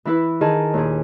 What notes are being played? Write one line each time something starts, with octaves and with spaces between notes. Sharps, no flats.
E3 E4 B4
D#3 G#4 A5
D#2 A#2 G#4